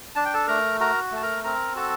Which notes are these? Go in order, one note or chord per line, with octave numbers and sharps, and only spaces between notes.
D4 A5
G5
A4 A5
A3 A#4 A#5
F#4 A#4 A#5
A3 A5
A#4 A#5
C4 A#4 A#5
F#4 A4 A5